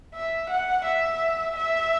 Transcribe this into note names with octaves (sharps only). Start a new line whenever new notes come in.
E5
F#5
E5
E5